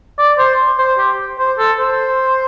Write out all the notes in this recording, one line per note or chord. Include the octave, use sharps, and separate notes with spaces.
D5
C5
C5
G4
C5
A4
C5